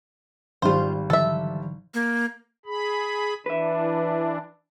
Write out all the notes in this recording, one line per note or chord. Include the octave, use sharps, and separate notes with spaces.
G#1 G3 F4 C5
D3 E3 F#3 A4 E5
A#3
G#4 B5
E3 D4 B4 E5